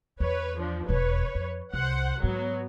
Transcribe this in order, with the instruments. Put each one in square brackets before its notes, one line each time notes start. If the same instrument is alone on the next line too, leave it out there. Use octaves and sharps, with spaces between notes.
[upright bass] E2 [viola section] B4 C#5
[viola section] F3 D4
[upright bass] E1 E2 [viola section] B4 C#5
[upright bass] F2
[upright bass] C2 [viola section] C5 F#5
[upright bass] G#2 [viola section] F#3 B3